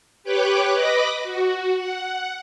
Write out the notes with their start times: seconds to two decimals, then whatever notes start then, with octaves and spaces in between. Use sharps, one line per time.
0.24 G4 B4 C#5 G5 D6 F#6
0.74 B4 D#5 B5 D6 A#6
1.23 F#4
1.76 F#5